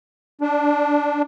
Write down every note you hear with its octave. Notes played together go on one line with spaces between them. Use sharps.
D4